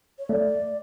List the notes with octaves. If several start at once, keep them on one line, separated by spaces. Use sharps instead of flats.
C#5
A3 D5